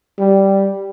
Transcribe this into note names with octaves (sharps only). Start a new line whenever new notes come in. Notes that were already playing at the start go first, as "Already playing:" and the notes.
G3